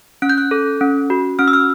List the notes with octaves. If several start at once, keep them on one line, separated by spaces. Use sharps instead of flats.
C#4 F#6
G6
F#6
A4
C#4
F#4
C#4 F6
E6
F6